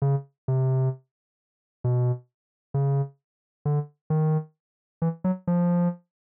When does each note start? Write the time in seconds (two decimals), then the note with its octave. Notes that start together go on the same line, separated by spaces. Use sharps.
0.02 C#3
0.48 C3
1.84 B2
2.74 C#3
3.65 D3
4.10 D#3
5.02 E3
5.24 F#3
5.47 F3